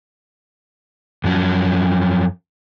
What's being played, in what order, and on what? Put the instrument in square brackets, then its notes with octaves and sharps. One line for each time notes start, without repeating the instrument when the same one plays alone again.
[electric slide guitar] F#2 F3 F#3 C#4